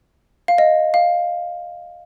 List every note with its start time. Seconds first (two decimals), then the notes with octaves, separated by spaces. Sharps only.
0.48 F5
0.58 D#5
0.94 F5